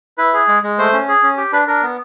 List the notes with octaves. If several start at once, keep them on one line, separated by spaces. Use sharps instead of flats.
E4 B4
G#4
G#3
G#3
A3 C5
C#4
G#4
C#4
G4
D4 B4
D4 A#4
B3